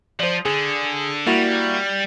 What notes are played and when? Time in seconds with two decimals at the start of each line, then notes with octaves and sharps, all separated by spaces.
0.20 F3 C5 D5
0.45 D3 G#4
1.26 G3 A#3 E4 F#4